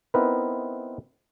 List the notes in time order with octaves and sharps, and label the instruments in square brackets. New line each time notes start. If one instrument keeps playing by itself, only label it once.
[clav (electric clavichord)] B3 C4 D#4 E4 A#4 B4